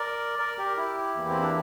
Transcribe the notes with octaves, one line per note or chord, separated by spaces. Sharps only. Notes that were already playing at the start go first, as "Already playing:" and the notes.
Already playing: A#4 D5
A#4 D5
G4 A#4
E4 G4
E2 E3 A#3
C4
D4